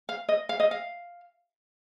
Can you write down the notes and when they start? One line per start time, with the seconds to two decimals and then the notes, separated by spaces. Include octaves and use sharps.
0.09 F5
0.29 D#5
0.49 F5
0.60 D#5
0.71 F5